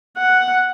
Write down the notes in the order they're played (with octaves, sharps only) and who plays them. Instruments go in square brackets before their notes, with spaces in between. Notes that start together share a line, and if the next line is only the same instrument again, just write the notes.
[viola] F#5